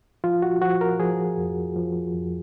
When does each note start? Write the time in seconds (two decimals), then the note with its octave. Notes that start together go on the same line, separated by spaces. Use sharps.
0.24 F3 F4
0.42 F#4
0.61 F3 F#4
0.81 A#4
0.99 F3 G#4
1.38 F2
1.76 F3
2.14 F2